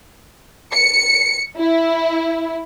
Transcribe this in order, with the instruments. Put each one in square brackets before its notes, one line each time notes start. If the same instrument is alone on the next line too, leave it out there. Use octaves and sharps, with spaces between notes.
[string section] C#7
E4